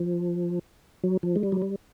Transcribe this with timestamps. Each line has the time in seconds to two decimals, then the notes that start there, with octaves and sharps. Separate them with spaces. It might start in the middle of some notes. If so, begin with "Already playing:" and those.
Already playing: F3
1.04 F#3
1.23 F3
1.36 G#3
1.43 G3
1.52 F#3
1.62 G3